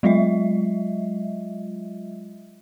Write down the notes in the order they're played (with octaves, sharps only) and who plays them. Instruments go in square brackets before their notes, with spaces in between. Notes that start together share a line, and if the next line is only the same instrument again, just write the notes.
[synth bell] F#3 G#3 F4 D#5 E5